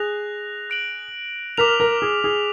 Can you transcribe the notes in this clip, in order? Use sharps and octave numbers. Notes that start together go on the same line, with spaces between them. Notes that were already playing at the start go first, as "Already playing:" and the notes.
Already playing: G#4 F#6 A#6 F7
F#6 D7 F#7
A#4 D6 F6 B6 F7
A#4
G#4
G#4